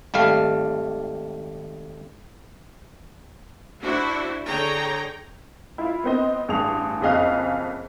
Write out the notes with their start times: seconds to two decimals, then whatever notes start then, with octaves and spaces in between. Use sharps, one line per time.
0.14 G#1 G3 A3 F5
3.82 D4 E4 F#4 C5
4.47 D3 G#4 C#5 G5 A#5
5.78 E4 F4
6.04 B3 C4 D#5
6.48 A1 G2 G#4 D#6 F7
7.01 F#1 F2 G#4 D#5 F5 F#6